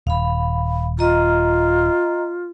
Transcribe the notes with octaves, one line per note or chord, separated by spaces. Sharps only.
D#1 F5 B5
F4 D#5 A#5